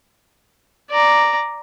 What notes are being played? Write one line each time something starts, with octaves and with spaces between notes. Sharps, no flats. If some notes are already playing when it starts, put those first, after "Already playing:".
D5 A#5